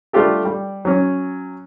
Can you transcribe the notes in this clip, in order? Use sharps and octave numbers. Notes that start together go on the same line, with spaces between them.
G3 A3 D4 F4 G4 A4
G3
F#3 C#4